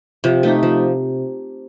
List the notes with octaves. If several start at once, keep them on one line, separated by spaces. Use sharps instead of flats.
C3 F3
A3 D#4 G4
F3